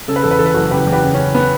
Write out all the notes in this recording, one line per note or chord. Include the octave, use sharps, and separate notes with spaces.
C#3 A4
B4
E2 A4
B4
E3 A4
B4
F#1 F#4 A4
C#3 G4 B4
E2
G4 B4
C#3
C#3 C#4
B3